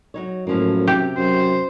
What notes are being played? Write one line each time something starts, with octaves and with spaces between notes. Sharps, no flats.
F#3 D#4 C#5
F#2 A2 F3 A#3
C3 G4 G5
F#2 C5